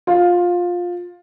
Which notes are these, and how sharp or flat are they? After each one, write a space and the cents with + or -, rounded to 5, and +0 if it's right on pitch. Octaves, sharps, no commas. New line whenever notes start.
F4 +15